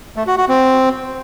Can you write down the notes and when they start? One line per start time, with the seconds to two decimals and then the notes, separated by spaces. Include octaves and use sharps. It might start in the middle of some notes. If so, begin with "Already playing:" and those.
0.16 A3
0.27 F#4
0.38 F#4
0.48 C4